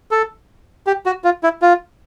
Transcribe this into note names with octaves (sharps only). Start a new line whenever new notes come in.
A4
G4
F#4
F4
E4
F4